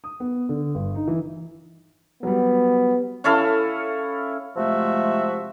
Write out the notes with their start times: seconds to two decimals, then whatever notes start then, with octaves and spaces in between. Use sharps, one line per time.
0.04 D#6
0.20 B3
0.49 D3
0.75 G1
0.95 D#4
1.07 E3
2.23 F#3 G3 B3
3.24 C#4 E4 A4 F5
4.57 C3 F3 G#3 A3 F#4 E5